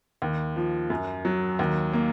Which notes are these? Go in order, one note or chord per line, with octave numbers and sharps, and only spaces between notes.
D#2
F3
F#2
F#3
D#2
A#3